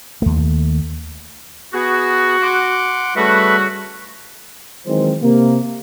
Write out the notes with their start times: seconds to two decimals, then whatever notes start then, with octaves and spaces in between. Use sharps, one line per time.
0.22 D#2 A3
1.74 B3 F#4 G#4
2.42 F#5 C6 D6
3.16 C#3 G3 A3 F#4 B4 E5
4.86 D#3 E3 F#3 G#3 C4 C5
5.22 C3 A#3